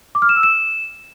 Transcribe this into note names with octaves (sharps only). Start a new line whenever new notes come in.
D6
F6
E7
E6
E7